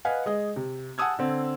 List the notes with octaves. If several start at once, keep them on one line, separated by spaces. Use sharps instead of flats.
B4 D#5 F5 F#5 G#5
G#3 G#4 D#5
C3
F#5 G#5 A5 D#6 E6 G#6
D3 C4